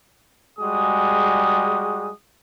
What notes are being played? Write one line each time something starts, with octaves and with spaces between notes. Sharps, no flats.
G3 G#3 F#4 G#4 D#6